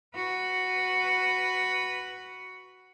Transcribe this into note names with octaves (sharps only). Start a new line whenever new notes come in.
F#4 B4